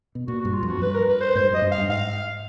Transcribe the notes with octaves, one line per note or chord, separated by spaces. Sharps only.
B2
A#2 F#4
G2 F#4
F4
F2 F#4
G2 B4
A#4
B4
C5
G#2 C5
G2
F#2 D#5
G2
F5
G2
G#2 F5